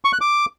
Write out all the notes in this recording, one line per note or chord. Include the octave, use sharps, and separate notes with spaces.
C#6
F#6
D6